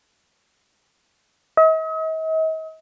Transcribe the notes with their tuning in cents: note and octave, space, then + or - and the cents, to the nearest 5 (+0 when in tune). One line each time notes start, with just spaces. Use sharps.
D#5 +45